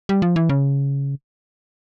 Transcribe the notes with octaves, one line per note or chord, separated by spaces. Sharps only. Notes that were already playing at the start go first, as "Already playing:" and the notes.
G3
F3
E3
C#3